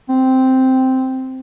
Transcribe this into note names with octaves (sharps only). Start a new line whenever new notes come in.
C4